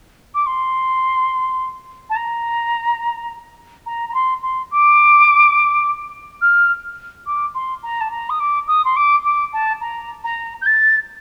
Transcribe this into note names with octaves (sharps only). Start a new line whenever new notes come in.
D6
C6
A5
A#5
A#5
A#5
C6
C6
D6
F6
D6
C6
A#5
A5
A#5
D#6
D6
D#6
C6
D6
D6
A5
A#5
A#5
G6
A6